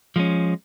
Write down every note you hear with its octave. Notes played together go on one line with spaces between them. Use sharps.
F3 G#3 C#4